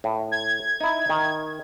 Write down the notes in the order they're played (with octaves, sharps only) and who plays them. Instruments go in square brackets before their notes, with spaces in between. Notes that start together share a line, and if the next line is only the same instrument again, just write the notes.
[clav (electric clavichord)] A2
[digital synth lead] G#6
[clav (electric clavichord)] D#4 E4
D#3